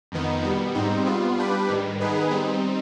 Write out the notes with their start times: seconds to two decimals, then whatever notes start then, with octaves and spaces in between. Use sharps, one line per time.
0.12 F2 D#3 B3 D#4
0.43 B2 G3 B3
0.74 G#2 G3 C4 D#4
1.06 G3 B3 F4
1.37 G3 D4 G4 B4
1.69 G#2 D#3 G3
2.01 D#3 B3 D#4 G#4 B4
2.31 G3 C4 D#4